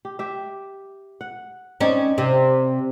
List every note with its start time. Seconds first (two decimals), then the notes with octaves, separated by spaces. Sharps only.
0.05 G4
0.19 G4 E5
1.21 F#5
1.81 C4 C#4 D#4 D5
2.18 C3 G4 E5